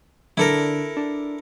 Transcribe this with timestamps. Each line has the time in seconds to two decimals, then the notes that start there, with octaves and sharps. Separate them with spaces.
0.37 D3 D4 E4 A4 A#4
0.97 D4